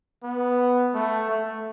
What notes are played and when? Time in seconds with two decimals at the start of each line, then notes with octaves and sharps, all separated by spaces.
0.23 B3
0.94 A3
1.30 A3